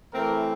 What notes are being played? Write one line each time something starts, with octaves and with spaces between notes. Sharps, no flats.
E3 A3 C4 A#4